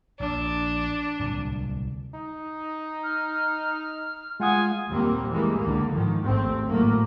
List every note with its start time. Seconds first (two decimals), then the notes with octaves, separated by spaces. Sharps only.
0.20 A#1 D4
1.19 D1 C2 A#2
2.14 D#4
3.04 F6
4.40 G#3 F4 F#5 G#5 D#6
4.89 D#2 A#2 G3 A#3 C4
5.30 E3 G3 G#3 A#3
5.60 C#2 D3 A#3
5.92 G#2 D#3 F3
6.25 G#1 D#2 A3 C4
6.68 G#1 A2 F#3 A3 A#3